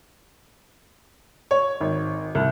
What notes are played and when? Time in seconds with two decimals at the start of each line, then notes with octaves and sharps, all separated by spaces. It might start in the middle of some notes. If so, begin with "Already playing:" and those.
1.51 C#5
1.81 G#1
2.35 C2